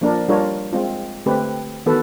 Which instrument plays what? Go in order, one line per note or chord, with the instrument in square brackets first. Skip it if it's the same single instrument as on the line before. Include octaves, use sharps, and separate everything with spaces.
[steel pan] F3 A#3 D4 F4 A#4
G3 D4 F4 A#4 C#5
G#3 C4 F4
D3 A3 C4 G4 B4
D#3 E3 B3 F#4 A4 B4